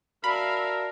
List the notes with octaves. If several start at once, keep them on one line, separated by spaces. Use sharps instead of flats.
F#4 A#4 D5 E5 F5 A5 B5